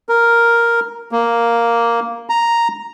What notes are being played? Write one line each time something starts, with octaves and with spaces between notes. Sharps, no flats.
A#4
A#3
A#5